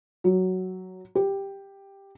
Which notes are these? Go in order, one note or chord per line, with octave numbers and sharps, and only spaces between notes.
F#3
G4